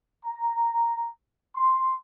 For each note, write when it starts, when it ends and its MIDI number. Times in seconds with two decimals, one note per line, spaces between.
0.25 1.08 82
1.54 1.94 84